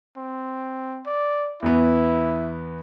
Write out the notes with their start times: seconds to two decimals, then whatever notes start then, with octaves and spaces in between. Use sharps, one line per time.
0.17 C4
1.07 D5
1.62 E2 E3 B3 E4